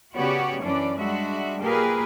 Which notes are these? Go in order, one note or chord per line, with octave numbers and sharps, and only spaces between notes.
C#3 B3 F#4 G4 C#5 D5
F#2 E3 C#4 D4 D5
G3 G#3 D4 F#4 E5
A#2 A#3 G4 G#4 A#4 B4